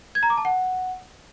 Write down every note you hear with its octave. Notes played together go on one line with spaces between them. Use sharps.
G#6
A#5
D6
A5
F#5